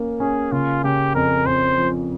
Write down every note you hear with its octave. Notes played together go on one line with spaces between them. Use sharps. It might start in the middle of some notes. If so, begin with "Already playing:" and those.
Already playing: A#3 C#4
C#4 G#4
C#3 F4
C#3 G4
F2 A#4
F2 C5
F3